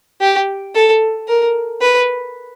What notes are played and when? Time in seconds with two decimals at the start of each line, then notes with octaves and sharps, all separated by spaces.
0.21 G4
0.75 A4
1.28 A#4
1.81 B4